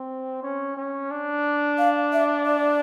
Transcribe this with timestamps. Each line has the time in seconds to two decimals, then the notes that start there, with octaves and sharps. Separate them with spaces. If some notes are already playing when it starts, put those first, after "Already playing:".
Already playing: C4
0.43 C#4
0.77 C#4
1.11 D4
1.78 F5
2.13 E5
2.46 D5